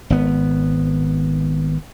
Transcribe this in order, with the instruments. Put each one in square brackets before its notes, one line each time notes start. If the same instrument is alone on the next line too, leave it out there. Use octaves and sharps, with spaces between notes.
[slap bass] G#1 B3